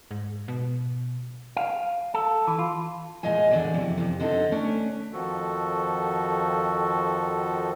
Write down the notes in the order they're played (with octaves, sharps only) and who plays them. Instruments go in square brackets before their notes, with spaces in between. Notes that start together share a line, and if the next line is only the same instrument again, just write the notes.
[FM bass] G#2
B2
[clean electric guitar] F5
A4
E3
F4
[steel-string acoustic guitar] A#2 G#3 D#5 F5 G#5
E2 A2 D3 E3 F#3 D5
F2 C3 E4
F2 C3
D3 C4 D#4 F4 A4
D3 A3 C#4 D4
[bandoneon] F2 D#3 F3 F#4 A4